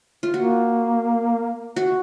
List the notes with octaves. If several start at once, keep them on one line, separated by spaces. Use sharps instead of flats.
F4
A#3 F#4
F#4